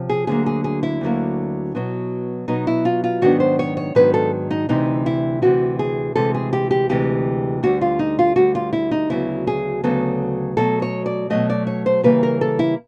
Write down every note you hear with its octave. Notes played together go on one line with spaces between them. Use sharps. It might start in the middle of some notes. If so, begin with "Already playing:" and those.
Already playing: C3 F3 C#4
G#4
D2 D3 F#3 A#3 G#4
G#4
G#4
E4
D2 D3 F#3 A#3
B2 F#3 B3
B2 F#3 B3 D#4
E4
F4
F4
G#2 D#3 F#3 B3 D4 F#4
C5
C#5
C#5
G#2 D#3 F#3 B3 D4 B4
A4
D#4
D2 C3 E3 D#4
E4
D2 C3 E3 F#4
G#4
D2 C3 E3 G#3 A4
G#4
G4
G4
D2 C3 E3 G#3 G4
D2 D3 G3 F#4
F4
D#4
F4
D2 D3 G3 F#4
F4
E4
D#4
D2 C#3 F#3 B3 E4
G#4
D2 C#3 F#3 B3 A4
B2 F#3 A3 A4
C#5
D5
B2 F#3 A3 D#5
D5
C#5
C5
C#3 E3 G3 A#3 B4
A#4
A4
E4